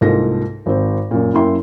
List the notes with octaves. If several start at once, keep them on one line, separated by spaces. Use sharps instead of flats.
C2 G#2 A#3 F4 A4 A#6
G#1 C4
F#2 A#2
F#2 A#3 E4 G5 C6